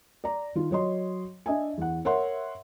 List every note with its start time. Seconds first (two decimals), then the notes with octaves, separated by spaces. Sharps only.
0.24 D5 A#5
0.55 D#3 F4
0.71 F#3 C#5 D#5 C6
1.46 D4 D#5 E5 G#5
1.78 E2 F#5
2.05 A#4 C#5 E5 F#5 C6